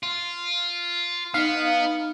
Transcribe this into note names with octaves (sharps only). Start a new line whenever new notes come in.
F4
B3 D#4 F5